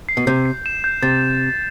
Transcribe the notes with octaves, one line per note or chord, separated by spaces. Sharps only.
C7
B2
C3 G6
C7
E7
G6
C3 A6